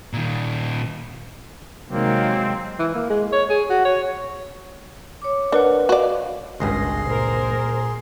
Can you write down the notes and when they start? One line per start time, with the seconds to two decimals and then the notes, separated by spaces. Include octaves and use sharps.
0.13 A#2 D#3
1.91 C3 D#3 F#3 G#3 A#3 C4
2.79 E3
2.95 A#3
3.10 G#3
3.32 C#5
3.50 G#4
3.70 F#4
3.85 C#5
5.22 C#5 D6
5.52 D4 A#4 B4 F#5
5.89 F#4 D5 D#5 F5
6.60 G#1 C#2 G2 G#4 C6 A#6
7.07 A#2 A#4 C5